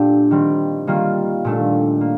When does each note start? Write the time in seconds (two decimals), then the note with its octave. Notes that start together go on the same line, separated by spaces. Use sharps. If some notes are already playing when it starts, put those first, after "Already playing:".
Already playing: A#2 A3 D4 F4 G4
0.31 D#3 G3 C4
0.87 D#3 G3 A#3 F4
1.45 A#2 A3 D4
2.01 A#3